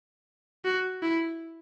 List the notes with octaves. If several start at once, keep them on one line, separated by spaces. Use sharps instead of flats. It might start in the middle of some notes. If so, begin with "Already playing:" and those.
F#4
E4